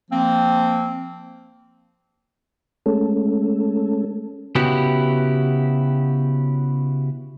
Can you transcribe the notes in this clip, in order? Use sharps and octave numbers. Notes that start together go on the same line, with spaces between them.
F3 A#3 C4
G#3 A3 C#4 A4
C#3 B3 E4 F#4 G4